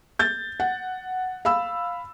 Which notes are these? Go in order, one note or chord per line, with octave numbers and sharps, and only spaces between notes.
G6 A6
F#5
F5 B5 E6